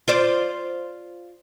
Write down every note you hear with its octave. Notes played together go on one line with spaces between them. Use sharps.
F4 C5 D5